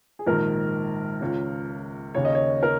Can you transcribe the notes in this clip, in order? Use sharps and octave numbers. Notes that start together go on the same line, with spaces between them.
G#4
A#1 G#2 D#3 A#4
C#2 C#3
D#2 C#3 C#5
D#5
C#5
A#4